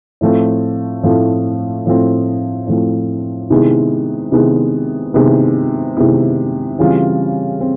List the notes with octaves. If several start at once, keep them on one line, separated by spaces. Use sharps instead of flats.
A2 F3 A3 C4
A2 F3 A3 C4
A2 F3 A3 C4
A2 F3 A3 C4
C3 D#3 G#3 B3 E4
C3 D#3 G#3 B3 E4
C3 D#3 G#3 B3 E4
C3 D#3 G#3 B3 E4
C#3 E3 G3 C4 F4
C4